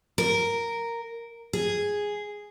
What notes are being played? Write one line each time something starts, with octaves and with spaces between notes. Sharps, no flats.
A#4
G#4